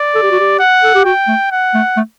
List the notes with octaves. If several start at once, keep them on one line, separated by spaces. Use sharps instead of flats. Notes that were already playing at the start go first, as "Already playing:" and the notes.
Already playing: D5
A4
G4
F#4
G4
F#5
A4
G4
F#4 G5
A3
F#5
A3
A3